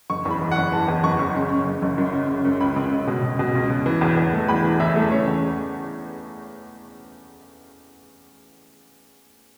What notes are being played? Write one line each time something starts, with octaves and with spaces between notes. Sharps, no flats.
F#1 C#6
E2
B5
E3
F#1 F#5
E3 A5
E2
F#1 C#6
F#1
C#3
C#3
F#1
F#1
F#2
C#3
C#3
F#2
C#2 B5
C#2
C#2
B2
B2
B2
C#2
B2
E3
E2
E2
A3
E2 B5
E3
E2 E5
A3
C#3 C#5
E2